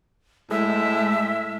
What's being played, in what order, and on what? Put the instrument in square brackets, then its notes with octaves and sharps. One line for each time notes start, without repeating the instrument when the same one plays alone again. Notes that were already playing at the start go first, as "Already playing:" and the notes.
[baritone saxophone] A2 [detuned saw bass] G#3 [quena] E5